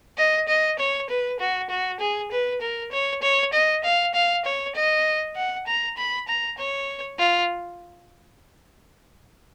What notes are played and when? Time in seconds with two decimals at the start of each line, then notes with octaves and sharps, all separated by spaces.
0.18 D#5
0.48 D#5
0.79 C#5
1.09 B4
1.40 F#4
1.70 F#4
2.00 G#4
2.31 B4
2.61 A#4
2.92 C#5
3.22 C#5
3.53 D#5
3.84 F5
4.14 F5
4.45 C#5
4.75 D#5
5.36 F#5
5.67 A#5
5.97 B5
6.28 A#5
6.58 C#5
7.19 F4